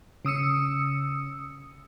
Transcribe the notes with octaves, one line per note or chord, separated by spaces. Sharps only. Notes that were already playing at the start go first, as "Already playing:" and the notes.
C#3 D#6 E6 C#7